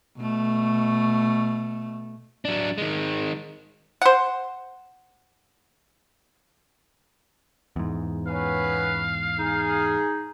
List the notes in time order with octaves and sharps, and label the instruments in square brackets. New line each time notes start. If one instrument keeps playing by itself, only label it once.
[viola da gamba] B2 A3
[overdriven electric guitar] F#3 D4
D#3 G#3
[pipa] C5 F#5
[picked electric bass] E2 G#2
[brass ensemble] B3 C#4 B4 [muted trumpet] F5
[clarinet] D#4 [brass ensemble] G#4